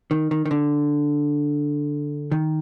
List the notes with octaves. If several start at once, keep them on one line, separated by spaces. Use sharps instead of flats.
D#3
D#3
D#3
D3
D#3